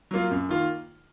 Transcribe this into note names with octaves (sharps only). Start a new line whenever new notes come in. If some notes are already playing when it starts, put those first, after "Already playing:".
F#3 A#3 F4
F#2
D#3 A#3 F4